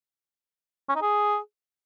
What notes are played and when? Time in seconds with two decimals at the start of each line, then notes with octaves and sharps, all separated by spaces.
0.89 C#4
0.95 D#4
1.02 G#4